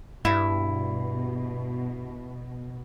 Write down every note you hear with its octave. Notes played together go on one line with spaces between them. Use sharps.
G2 B2 E4